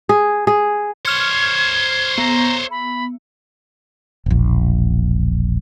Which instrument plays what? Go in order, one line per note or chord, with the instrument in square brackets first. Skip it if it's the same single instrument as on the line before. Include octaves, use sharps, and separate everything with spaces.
[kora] G#4
G#4
[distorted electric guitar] C5 C#5 [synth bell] F6 C#7 [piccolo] G#6
[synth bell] B3 [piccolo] A#5
[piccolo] B5
[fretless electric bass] E1 A#1